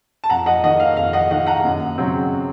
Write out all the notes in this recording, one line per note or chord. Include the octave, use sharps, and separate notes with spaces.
A5
F2 F#5 A#5
D#5 F#5
D#3 A#3 D#5 F#5
F5
F2 F5
D#5 F#5
D#3 A#3 D#5 F#5
F#5 A#5
F#2
C#3 F#3 C4